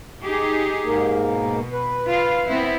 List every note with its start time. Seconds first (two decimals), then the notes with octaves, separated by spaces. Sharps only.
0.24 D#4 G4 G#4
0.85 G#2 A#3
1.18 B2
1.73 B4
2.05 F4 F5
2.47 B3 C4 E4